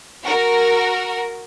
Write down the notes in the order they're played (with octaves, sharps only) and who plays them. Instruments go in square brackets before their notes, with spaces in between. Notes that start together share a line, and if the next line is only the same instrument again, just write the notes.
[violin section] F#4 A#4